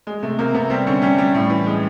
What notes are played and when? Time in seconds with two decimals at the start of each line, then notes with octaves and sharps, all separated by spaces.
0.07 G#3
0.23 C3 A3
0.39 C3 A#3
0.54 C3 B3
0.70 G3 C4
0.87 D3 C#4
1.02 G3 C#4
1.18 G3 D4
1.34 A2
1.50 E3
1.66 G#3